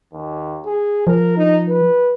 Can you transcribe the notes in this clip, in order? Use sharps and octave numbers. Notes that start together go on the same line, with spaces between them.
D#2
G#4
F3 A#4
D#4
B4